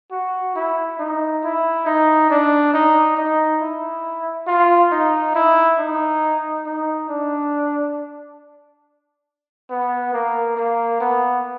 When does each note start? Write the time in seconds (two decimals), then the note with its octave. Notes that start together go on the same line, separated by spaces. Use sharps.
0.12 F#4
0.56 E4
0.99 D#4
1.43 E4
1.86 D#4
2.30 D4
2.74 D#4
3.17 D#4
3.61 E4
4.47 F4
4.92 D#4
5.35 E4
5.79 D#4
6.66 D#4
7.09 D4
9.70 B3
10.14 A#3
10.57 A#3
11.00 B3